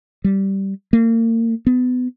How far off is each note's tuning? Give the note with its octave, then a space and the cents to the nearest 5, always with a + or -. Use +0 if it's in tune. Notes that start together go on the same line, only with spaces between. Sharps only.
G3 -10
A#3 -35
B3 +25